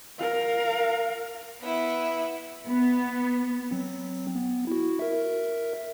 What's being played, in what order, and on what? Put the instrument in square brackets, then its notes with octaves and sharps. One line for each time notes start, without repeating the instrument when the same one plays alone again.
[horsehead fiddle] A#4 F5
[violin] B3 E4
[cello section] B3
[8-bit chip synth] F#3 C4
B3
E4 F#4
A#4 E5